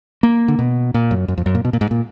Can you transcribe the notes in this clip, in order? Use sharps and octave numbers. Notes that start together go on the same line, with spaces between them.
A#3
D3
B2
A#2
F#2
F#2
F2
F#2
A#2
B2
A#2
G#2
A#2